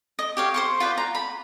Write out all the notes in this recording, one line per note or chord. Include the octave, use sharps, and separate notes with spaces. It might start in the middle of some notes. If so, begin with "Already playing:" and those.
D#5
G4 C#5 F5
C5 C6 C#6
F4 B4 C5 D5
A#5
B5